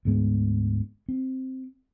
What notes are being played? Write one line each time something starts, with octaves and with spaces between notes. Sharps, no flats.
D2 G#2 G#3 B3
C4